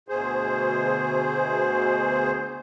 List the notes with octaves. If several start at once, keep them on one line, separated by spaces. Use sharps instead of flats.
D2 B2 G#4 C5